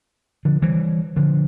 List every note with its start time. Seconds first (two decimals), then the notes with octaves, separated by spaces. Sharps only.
0.45 D3 F3
0.62 E3 G3
1.16 D3 F3